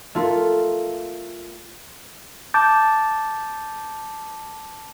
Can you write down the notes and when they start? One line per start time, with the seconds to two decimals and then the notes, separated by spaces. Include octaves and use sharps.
0.15 A3 F4 A#4
2.54 A5 D6 G6 A6